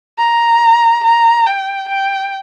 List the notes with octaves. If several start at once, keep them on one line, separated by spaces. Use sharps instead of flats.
A#5
A#5
G5
G5